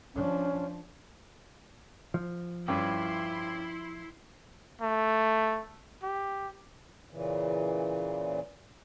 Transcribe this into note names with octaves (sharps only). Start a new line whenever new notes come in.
F3 C#4 D4
F3
G2 C#4 E4 G5 C6 D6
A3
G4
A#2 C#3 E3